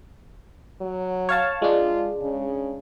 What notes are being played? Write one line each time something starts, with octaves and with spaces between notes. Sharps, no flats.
F#3
C#5 F5 A5
G#3 D4 F4
C#3